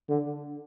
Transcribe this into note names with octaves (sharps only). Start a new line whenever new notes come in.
D3